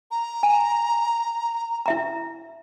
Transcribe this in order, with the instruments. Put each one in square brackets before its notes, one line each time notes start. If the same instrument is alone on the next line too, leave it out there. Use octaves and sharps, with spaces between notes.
[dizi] A#5
[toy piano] G#5
E4 E5 A#5